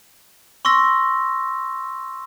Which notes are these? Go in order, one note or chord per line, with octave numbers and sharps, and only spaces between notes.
C6 C#6 E6 A#6